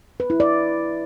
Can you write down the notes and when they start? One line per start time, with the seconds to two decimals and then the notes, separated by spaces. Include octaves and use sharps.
0.20 B4
0.30 E4
0.40 D5